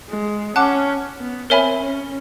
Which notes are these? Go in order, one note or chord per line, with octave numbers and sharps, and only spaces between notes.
G#3
C#4 F#5 A5 D6 F#6
B3
C4 A#4 C#5 E5 G#5 B5
C#4